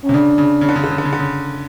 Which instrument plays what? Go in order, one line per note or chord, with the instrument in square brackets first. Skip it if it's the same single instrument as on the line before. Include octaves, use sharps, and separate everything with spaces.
[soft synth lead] C#4
[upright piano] C3
[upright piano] C#3 [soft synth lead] D4
[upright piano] C#3
C#3
D3
C#3
D3
C#3
D3
C#3
D3
C#3